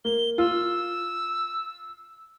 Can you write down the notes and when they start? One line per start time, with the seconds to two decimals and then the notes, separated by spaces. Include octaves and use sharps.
0.05 A#3 G7
0.38 F4 E6